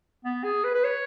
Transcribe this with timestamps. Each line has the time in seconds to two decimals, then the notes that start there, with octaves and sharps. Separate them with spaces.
0.25 B3
0.44 G#4
0.64 B4
0.75 B4
0.84 C#5